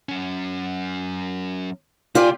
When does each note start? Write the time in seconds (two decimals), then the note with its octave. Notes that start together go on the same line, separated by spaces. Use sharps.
0.09 F#3 C#4
2.15 C3 F4 G4 D5 G#5